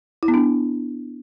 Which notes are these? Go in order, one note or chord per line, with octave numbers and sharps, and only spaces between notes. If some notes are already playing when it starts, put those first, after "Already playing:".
E4
B3
D4